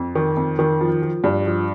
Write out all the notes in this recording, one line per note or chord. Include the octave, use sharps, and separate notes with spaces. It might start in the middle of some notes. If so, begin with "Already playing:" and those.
Already playing: F2
D#3
F2
D#3
F3
F3
G2
F3